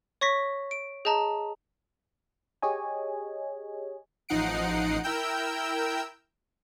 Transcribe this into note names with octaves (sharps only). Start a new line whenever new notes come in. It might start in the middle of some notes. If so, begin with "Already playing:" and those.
C#5 C#6 A#6 B6
D7
G#4 D#5 A5 A#5
G4 G#4 C#5 D#5 G#5
A1 F3 D#4 F#5 C7 D7
E4 A#4 G5 E6 G6